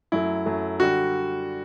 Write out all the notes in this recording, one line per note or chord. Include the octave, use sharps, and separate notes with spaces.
F#2 F#3 A3 E4
F#2 F#3 A3
D3 G3 F#4